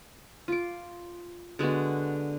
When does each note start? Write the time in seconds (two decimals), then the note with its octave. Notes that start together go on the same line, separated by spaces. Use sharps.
0.48 F4 D6
1.59 D3 G#3 B3 F#4